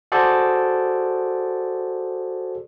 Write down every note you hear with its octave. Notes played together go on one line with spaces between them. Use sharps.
F#4 G#4 A4 C5 D5